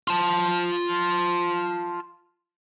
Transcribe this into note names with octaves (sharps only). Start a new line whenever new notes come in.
F4 A5